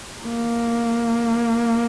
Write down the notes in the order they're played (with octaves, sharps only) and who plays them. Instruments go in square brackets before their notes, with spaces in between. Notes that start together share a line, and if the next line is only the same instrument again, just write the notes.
[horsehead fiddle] A#3